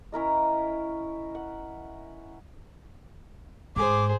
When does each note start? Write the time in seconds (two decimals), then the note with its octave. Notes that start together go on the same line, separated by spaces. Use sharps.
0.12 C#4 E4 A#4 D#5
1.35 F#5
3.76 G#2 G#4 C5 D6